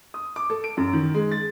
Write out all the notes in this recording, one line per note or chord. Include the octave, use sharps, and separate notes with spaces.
D#6
D6
A4
D7
F#2
D#3
G#3
A6